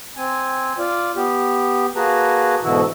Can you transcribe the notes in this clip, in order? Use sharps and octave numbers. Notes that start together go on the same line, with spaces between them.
C4 G#5
F4 D5
B3 G4
A#3 F#4 G#4 B4 A5 A#5
G#2 B2 D3 E3 E4 F#4